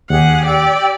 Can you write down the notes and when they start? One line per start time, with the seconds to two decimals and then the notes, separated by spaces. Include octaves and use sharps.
0.10 D#2 G4 G#4 F#5
0.46 G4 D5 G5 E6